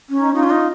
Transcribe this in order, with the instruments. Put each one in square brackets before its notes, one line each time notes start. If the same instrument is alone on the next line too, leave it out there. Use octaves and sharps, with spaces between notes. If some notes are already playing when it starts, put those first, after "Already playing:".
[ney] C#4
[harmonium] D#4
[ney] D#4 [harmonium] F4
[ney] C#4
D#4